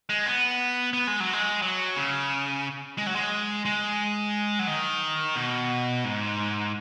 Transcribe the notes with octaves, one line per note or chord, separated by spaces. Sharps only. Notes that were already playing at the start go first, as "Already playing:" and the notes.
G#3
B3
B3
G#3
F#3
G#3
F#3
C#3
G#3
F#3
G#3
G#3
F#3
D#3
B2
G#2